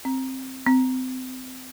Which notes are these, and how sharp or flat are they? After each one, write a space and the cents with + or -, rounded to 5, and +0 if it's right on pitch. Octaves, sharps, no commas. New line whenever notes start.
C4 +5
C4 -30